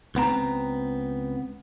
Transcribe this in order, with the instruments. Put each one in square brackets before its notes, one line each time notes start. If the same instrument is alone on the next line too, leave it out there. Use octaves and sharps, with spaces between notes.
[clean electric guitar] C#2 B3 C4 A#5